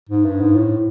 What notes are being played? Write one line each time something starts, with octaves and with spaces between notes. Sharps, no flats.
G#2
G2
G#2
A2